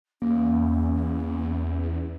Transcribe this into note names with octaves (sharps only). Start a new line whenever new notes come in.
E2 A#3 C#4